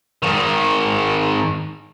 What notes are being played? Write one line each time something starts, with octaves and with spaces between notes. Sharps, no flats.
G#2 D#3